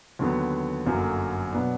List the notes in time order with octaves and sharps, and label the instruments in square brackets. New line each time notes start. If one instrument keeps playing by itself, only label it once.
[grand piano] D#2 D3 F#3 B3
G1 F#2 D3 F#3 A#3
B2 F#3 B3 D4